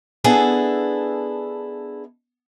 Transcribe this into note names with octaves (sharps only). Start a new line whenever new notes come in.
B3 D4 E4 G#4 A4